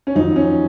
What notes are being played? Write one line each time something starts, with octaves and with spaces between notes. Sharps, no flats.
C#4
F2 D#3 F#3 D#4
C#4